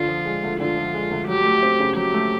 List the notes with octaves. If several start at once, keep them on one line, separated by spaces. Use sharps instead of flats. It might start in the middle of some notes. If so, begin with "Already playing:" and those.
Already playing: D3 F4
F3
G#3
D2
D3 F4
F3
G#3
D2
F#3 G4
A3
C4
C#3
F#3 G4
A3